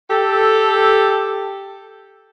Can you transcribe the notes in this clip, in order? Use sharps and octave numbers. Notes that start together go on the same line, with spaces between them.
G4 A4